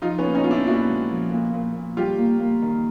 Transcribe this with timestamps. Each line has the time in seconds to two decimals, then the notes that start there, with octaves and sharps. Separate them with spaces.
0.02 F3 D#4 F4
0.18 B3 C#4
0.24 A#2
0.35 C#4 D#4
0.44 B3 F4
0.51 D4 E4
0.67 A#2 E4 F#4
0.89 G#3
1.11 F3
1.32 A#2
1.54 A#2
1.76 A#2
1.97 G3 F4 G4
2.18 A#3
2.40 A#3
2.62 D#3